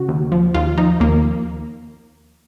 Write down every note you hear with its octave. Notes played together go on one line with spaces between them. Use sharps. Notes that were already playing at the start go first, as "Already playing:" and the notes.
Already playing: C#3 F#4
D#2
F3
D#2 F4
F3 D#4
D#2 A#3